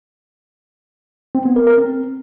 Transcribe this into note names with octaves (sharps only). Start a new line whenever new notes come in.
C4
B3
A#4
A#4
C4